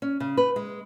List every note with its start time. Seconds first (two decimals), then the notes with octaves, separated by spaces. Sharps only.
0.02 C#4
0.20 C#3
0.37 B4
0.56 G#3